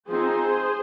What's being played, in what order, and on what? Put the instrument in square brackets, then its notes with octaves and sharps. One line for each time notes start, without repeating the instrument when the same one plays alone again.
[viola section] F3 C4 D#4 G#4 C5